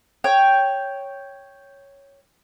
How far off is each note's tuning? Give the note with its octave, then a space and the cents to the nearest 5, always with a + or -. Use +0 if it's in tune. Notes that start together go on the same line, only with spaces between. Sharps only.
C#5 +0 G5 +0